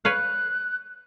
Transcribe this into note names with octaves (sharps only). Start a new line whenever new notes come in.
B4 C#5 F5 F#6